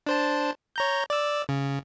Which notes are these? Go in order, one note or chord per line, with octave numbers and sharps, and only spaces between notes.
D4 C5 A5
C#5 A#5 G6
D5 E6
C#3